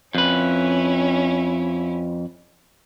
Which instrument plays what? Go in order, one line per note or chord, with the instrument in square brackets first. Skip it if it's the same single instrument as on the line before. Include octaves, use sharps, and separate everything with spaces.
[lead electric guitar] F2 B4 [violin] C#4 E4